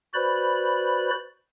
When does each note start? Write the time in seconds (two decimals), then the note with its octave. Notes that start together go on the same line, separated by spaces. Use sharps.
0.14 F#4 B4 C5 D5 B5